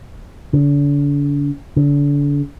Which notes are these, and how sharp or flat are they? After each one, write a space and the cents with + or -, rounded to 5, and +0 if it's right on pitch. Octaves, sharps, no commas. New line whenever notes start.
D3 -40
D3 -35